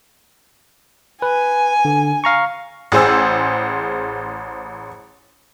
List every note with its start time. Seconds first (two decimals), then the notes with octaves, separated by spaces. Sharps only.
1.22 B4 G#5
1.85 D3
2.24 F5 A#5 C#6
2.92 A1 G#4 C5 E6